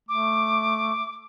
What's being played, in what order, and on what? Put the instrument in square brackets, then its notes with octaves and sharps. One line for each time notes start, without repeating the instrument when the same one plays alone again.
[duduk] A3 [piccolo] D6